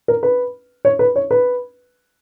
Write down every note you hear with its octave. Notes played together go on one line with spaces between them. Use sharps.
A#4
B4
C#5
B4
C#5
B4